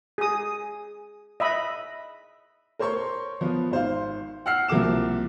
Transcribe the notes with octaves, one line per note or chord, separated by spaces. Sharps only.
G#4 D#6
D#5 E5 B5
A#4 C5 C#5 C6 C#6
F3 B3
G#1 C5 F5
F#5 E6 F6 C7
C2 F3 A#3 F#4 D6 E7